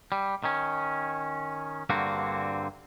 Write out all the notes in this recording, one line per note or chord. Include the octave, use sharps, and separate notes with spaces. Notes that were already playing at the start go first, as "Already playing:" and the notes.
G3
D#3 C#4
G2 D3 A#3 C4 F#4